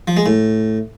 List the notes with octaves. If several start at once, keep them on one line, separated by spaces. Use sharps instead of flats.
F3
G#3
A2